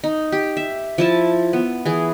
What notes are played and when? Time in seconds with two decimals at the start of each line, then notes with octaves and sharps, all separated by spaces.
0.04 D#4
0.32 G4
0.57 E5
0.98 F3 E4 A5
1.53 B3
1.86 E3 G#4